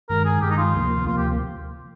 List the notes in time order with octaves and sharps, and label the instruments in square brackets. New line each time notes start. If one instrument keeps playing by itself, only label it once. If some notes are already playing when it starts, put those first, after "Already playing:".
[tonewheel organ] G2 D#3 G#3 [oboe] A#4
[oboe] G#4
[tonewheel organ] G2 D#3 G#3 [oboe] G4
[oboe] D#4
F4
[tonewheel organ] D2 C3 F3 A#3
[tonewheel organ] D2 C3 F3 A#3 [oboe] F4
[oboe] G4